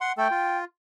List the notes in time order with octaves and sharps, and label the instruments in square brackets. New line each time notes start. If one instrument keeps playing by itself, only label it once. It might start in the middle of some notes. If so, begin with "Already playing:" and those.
[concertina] F#5 C6
[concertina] A3 A4 [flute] G5
[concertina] F4